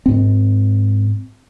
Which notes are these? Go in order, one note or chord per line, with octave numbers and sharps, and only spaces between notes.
G#2 C4